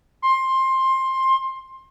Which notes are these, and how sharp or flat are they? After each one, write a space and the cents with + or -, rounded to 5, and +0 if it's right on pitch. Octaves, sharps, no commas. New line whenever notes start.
C6 +15